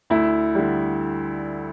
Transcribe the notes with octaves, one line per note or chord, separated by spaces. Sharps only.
D2 E4
D3 G3